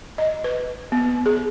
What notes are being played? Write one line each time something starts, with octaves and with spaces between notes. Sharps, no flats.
D#5
B4
B3
G#4